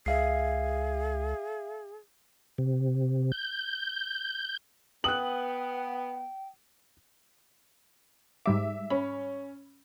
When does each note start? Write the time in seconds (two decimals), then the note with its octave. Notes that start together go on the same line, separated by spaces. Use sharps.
0.06 C#2 G#4 E5 F5 C7
2.58 C3
3.32 G6
5.04 B3 G5 D#6 F#6 F#7
8.46 G#2 G3 E5 D6
8.90 C#4 B5